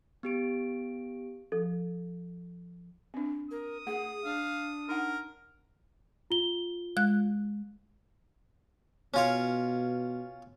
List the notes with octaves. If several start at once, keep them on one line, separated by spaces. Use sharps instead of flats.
B3 G4 D7
F3 A4
C4 D4
A#4 D#6
A3 G#4 F#5
D4 F5
D#4 A#4 F#5
F4 G7
G#3 F#6
B2 C#4 F4 C#5